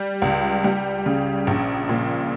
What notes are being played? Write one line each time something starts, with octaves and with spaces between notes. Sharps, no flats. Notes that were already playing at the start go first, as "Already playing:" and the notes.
Already playing: G3
C#2
G3
C#3
A#1
A#2